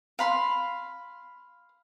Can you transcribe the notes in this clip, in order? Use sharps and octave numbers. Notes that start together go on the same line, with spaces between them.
F5 B5 C6